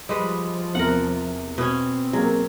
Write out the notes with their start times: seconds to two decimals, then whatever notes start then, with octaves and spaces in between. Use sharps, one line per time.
0.09 F3 G3 G#3 B4 D#5
0.75 E2 C3 A#4 F#5
1.58 B2 C4 C#4
2.13 F#3 G#3 A#3